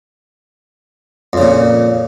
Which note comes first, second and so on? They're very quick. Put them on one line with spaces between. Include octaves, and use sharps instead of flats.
F2 C#3 A#2